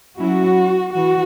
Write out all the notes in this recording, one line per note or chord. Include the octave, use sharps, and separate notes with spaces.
F#3 C#4 E4 F#4
E3 F#4